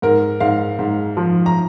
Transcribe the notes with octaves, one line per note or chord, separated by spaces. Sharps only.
G#2 A#4
G#2 F5
G#2
F3
A#5